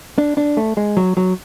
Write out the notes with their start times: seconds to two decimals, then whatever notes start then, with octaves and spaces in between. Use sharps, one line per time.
0.18 D4
0.37 D4
0.57 A3
0.77 G#3
0.97 F#3
1.17 F#3